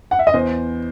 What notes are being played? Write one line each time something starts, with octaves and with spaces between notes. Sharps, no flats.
F#5
E5
D#5
E2 C5